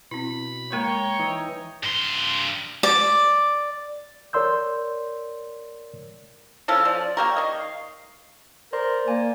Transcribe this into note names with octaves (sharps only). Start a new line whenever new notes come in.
B2 C4 E4 B5
G#3 A#3 A#4 C#5 G5 A#5
E3 D#4
G2 C6
D5
A#4 C#5 D5 C6 E6 G6
C#3 F3 A4 F6
F3 D5
A#3 G4 A#4 C#6
D#3 D#5
F5
A#4 C5 D5 C6
A#3 D5 G#5